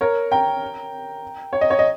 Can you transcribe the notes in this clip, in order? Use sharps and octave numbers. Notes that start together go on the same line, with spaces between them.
A#4 C#5
G5 A#5
C#5
D#5
C#5
D#5